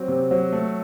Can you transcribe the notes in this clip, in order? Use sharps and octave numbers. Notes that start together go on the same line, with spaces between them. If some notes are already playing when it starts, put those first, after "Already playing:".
Already playing: F#3 C4
C3
F#3
A3